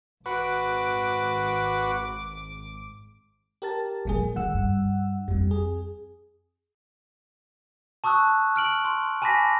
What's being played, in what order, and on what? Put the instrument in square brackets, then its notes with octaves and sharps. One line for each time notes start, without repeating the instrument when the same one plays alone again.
[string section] G#1 D6 [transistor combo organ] F#4 B4
[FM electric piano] G4 A#4 A5
[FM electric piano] A#1 A#3 G#4 [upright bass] F3 F#3
[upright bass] D#3 [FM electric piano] F#5 E6
[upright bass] G2
[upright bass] F2 C4 [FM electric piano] G3
[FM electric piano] G#4
[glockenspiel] A5 C#6 D#6 E6 F#6
F6 D7 F#7
C6
G#5 A5 B5 D6 A#6 B6